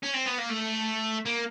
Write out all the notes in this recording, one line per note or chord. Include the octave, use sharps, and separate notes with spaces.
C#4
C4
B3
A#3
A3
A#3